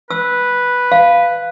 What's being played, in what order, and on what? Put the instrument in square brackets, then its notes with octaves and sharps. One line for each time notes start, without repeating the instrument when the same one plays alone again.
[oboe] B4 [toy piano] E6
[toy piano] F5